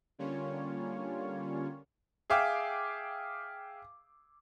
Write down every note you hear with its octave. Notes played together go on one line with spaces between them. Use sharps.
D3 G3 A#3 C#4 F4 C#5
G#4 E5 F5 G5 D6 E6